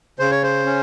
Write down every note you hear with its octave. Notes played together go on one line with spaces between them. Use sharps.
C#3 C5
C#5
C5
C#4